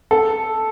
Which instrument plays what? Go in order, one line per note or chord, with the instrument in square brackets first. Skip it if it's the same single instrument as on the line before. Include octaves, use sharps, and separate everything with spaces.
[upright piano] A4